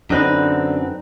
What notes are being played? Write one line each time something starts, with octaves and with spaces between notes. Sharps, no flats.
F#2 D3 C4 D#4 B4 F#6